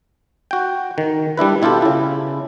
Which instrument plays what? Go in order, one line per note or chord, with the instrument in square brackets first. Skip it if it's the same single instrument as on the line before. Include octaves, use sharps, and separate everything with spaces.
[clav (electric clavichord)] F#4 G5
D#3
G3 D4 E4 B4
B2 E4 F4 G4 A4
C#3 E4